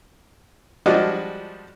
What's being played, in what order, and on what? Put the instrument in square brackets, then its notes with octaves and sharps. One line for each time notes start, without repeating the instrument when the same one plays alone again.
[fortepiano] F3 G3 G#3 D4 F#4 D#5